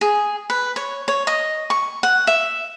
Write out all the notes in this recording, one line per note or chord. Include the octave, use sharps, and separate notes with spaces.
G#4
B4
C#5
C#5
D#5
C#6
F#5
E5